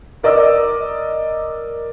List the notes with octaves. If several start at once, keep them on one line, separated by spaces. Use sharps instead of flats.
A#4 D5 D#5 D6 E6